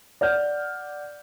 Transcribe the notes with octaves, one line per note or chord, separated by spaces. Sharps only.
D5 F#5 F6 G6